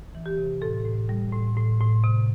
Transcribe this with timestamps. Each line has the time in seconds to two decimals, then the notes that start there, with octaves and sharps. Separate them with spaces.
0.15 E3
0.26 G4
0.38 C3
0.61 A2 A4
0.85 A2
1.09 G3
1.33 A2
1.57 A2
1.80 A2
2.04 C3